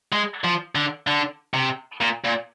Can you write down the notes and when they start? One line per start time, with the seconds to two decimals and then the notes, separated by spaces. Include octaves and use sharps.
0.12 G#3
0.44 F3
0.75 D3
1.07 D3
1.54 C3
2.01 A#2
2.24 A#2